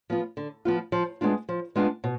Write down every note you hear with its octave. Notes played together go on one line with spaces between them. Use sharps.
F3 B3 F4
D3
F3 B3 F4
F3
G#3 B3 D4 F4
F3
G#3 B3 D4 F4
B2